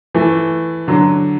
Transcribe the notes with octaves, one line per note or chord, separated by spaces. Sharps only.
E3 A3
D3 F#3